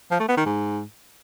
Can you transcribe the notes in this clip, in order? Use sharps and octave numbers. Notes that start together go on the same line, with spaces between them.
F3
A3
B3
D#3
G#2